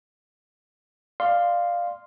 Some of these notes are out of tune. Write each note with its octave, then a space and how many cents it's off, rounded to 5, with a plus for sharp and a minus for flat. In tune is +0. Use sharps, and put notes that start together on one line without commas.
D5 +20 F5 +0 C6 +0